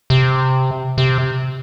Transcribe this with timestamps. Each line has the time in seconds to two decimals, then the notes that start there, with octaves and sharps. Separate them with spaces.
0.10 C3
0.98 C3